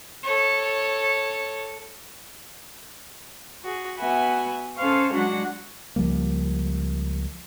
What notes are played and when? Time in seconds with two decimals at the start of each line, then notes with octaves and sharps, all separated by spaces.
0.23 A4 C#5
3.63 F#4 G#4
3.97 B3 F#4 E5 F#5 G#5 B5
4.77 C#4 A4 C5 F5 C#6
5.12 F#3 G#3 D4 F#4 F#5
5.96 C#2 F3 G3 A#3